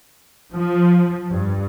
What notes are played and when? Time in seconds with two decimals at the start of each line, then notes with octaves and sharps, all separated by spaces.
0.52 F3
1.29 G2